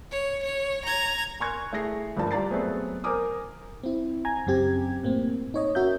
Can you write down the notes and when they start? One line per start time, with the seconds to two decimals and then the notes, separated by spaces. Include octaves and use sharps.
0.11 C#5
0.43 C#5
0.85 A#5 G#6
1.40 G#5 C6 C#6 F#6 G#6
1.73 A3 E4 G#4 A#6 C7
2.17 D2 G2 F3 A#3 A5
2.31 G3 F4 D5 A#5 A6 C7
2.50 F#3 A3 B3 C4 G#4
3.04 A#4 C5 G#5 D6 D#6
3.83 C4 E4
4.25 G#5 A#5 G#6
4.47 F#2 C#3 C4 G4 G#6
5.03 A2 A#3 C4
5.54 D#4 C#5 D#5
5.75 C#4 F#4 A#4 E5 G6